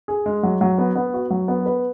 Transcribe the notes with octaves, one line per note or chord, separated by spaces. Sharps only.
G#4
G#3
F#3
F#3
B3
B3
F#4
F#3
B3
B4